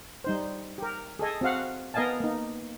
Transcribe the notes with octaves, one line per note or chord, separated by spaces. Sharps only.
G3 D#4 C5
G4 A#4
G#4 A4 D#5 G#5
C4 F#4 F5 F#5
B3 A#4 D#5 F5 G#5 A5
A#3 D#4